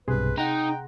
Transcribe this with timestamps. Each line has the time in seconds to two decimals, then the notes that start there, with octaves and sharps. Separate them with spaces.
0.08 B1 G2 C3 G#4 B4 C6
0.38 D#4 F#5 G5 A#5